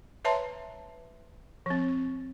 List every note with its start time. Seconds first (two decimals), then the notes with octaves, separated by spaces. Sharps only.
0.25 B4 C#5 E5 A5 A#5 C6
1.66 F3 C4